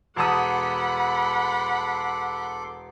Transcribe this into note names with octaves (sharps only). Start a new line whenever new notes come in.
E1 A4 F#5 A5 B5 C6 D6 D#6